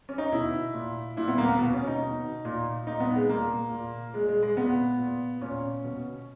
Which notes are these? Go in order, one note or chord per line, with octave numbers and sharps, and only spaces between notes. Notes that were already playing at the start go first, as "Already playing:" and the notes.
C#4
D#4
B2 E4
A#2
A#2 E4
B3
A#3
B3
B2
C#4
D#4
B2
A#2
A#2 D#4
B3
G#3
A#2 A#3
A#2
A#2 G#3
G#3
G#3
A#2 B3
A#2
A#2 C#4
B2